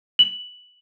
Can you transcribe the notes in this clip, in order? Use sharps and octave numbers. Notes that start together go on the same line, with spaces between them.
F#7